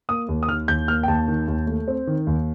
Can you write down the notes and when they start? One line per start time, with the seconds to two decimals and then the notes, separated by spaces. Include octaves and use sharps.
0.09 A#3 D#6
0.29 D#2
0.43 D#6
0.48 D#3 F6
0.68 D#2 G6
0.88 A#3 F6
1.03 G5
1.08 D#2 A5
1.28 D#3
1.48 D#2
1.67 A3
1.88 C4
2.07 D#3
2.27 D#2